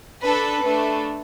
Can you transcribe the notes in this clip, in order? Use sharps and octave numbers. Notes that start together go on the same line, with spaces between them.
D4 A4 B4
A3 D4 A4 B4